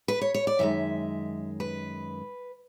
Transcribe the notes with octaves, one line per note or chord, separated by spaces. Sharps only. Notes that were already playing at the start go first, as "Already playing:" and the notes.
B4
C#5
C#5
D5
F#2 D#3 G#3 E5
B4